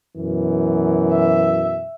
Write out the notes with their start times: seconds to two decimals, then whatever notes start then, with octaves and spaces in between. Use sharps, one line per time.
0.18 F#2 B2 E3
1.12 E5